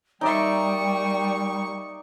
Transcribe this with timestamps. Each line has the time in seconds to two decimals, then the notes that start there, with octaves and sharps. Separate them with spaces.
0.21 G3 A#3 D#4 D5 E5 G5 C#6